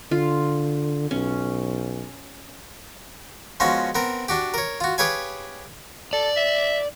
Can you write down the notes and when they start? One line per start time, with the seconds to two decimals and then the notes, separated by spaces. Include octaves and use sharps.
0.11 D3 F4
1.11 B1 C#4
3.60 F3 G#3 B3 C#4 F#4
3.95 B3 C4 A#4
4.29 D4 F#4 G4
4.54 A#4 C#5
4.81 F4 F#4
4.98 G4 G#4 B4 C#5 F5 G#5
6.13 A4 D5
6.36 E5